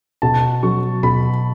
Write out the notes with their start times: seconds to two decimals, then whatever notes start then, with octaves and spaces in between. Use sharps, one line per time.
0.22 B2 A5
0.63 F#3 C#6
1.03 B2 B5